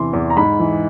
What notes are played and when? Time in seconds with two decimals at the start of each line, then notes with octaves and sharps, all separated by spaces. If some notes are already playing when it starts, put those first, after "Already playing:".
Already playing: E2 C3 E3 C6
0.13 E2
0.30 A#5
0.36 G#2 B5
0.59 E3